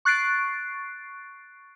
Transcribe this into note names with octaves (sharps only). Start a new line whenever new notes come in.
C#6 F#6 A6 C7 D7